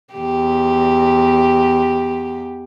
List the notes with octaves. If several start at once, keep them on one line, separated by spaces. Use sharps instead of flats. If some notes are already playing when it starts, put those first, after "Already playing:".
E2 G4